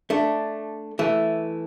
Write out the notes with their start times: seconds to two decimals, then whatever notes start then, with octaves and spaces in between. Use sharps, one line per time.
0.10 A3 D4
0.99 E3 A3